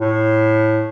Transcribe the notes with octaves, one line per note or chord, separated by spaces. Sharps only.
A2